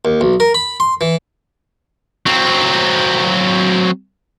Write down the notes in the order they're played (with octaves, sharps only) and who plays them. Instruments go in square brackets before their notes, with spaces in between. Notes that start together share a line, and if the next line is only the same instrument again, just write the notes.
[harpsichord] D#2
B1
A#4
B5
C6
E3
[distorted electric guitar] F#3 C4